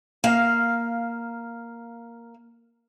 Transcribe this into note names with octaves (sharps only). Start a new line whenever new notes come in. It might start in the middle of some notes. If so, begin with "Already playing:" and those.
A#3 F5